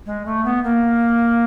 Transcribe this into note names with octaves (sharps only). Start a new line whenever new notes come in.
G#3
A3
B3
A#3